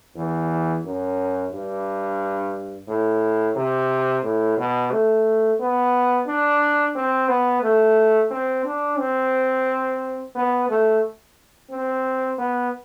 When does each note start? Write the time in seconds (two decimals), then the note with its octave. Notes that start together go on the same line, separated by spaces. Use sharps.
0.16 E2
0.84 F#2
1.52 G2
2.88 A2
3.56 C3
4.23 A2
4.57 B2
4.91 A3
5.60 B3
6.27 D4
6.95 C4
7.28 B3
7.62 A3
8.31 C4
8.65 D4
8.99 C4
10.35 B3
10.69 A3
11.70 C4
12.38 B3